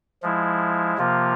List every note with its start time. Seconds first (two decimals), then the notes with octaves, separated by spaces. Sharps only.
0.23 F3 G#3 E4
0.98 C3 F3 A#3 F4